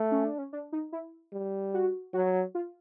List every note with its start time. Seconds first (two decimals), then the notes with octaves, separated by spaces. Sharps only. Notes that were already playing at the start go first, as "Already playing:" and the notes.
Already playing: A3
0.11 C#4
0.25 D4
0.38 C#4
0.53 D4
0.72 D#4
0.92 E4
1.32 G3
1.74 F#4
2.14 F#3 F#4
2.55 F4